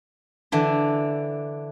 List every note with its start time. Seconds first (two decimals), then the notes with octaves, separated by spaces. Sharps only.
0.52 D3 E3 D4